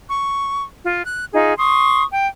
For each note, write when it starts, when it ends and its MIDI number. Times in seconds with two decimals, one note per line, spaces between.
0.09 0.63 85
0.82 1.05 65
1.05 1.25 90
1.33 1.54 63
1.33 1.54 65
1.33 1.54 68
1.58 2.03 84
1.58 2.03 85
1.58 2.03 87
2.13 2.28 79